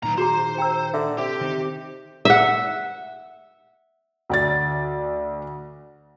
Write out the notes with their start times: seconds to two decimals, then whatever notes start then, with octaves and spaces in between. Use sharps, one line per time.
0.03 B1 A#2 D#3 A#5
0.18 F#4 G#4 C5 A#5
0.58 G5 A#5 E6
0.94 D3 E5
1.18 C3 G4
1.41 D#3 C4 D#4
2.25 E5 F#5
4.30 D2 D5 A6